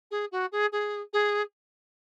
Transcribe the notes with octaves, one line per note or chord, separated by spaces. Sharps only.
G#4
F#4
G#4
G#4
G#4